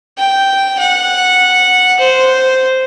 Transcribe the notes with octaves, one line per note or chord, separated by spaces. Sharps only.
G5
F#5
C5